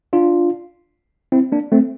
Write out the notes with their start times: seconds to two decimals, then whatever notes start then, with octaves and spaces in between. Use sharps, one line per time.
0.13 D4 F4
1.32 C4 E4
1.52 A#3 D4
1.72 A3 C4